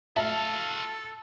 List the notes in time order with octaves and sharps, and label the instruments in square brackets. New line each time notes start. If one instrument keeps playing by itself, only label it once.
[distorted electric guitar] F#4 F5 [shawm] A4 [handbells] E5 [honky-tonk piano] A5